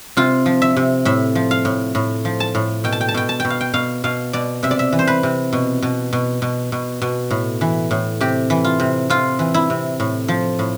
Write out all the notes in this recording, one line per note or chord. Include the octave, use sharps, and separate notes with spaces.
C3 F4
F3
E5
C3
A2 E5
F3
F5
A2
A2
F3
A5
A2
B2 G5
A5
G5
A5
B2 G5
A5
B2 G5
F5
G5
B2 F5
B2 F5
B2 D5
C3 E5
D5
E5
E3
C5
B4
C3
B2
B2
B2
B2
B2
B2
A2
E3
A2
C3 G4
E3
F4
C3
C3 F4
E3
E4
C3
A2
F3
A2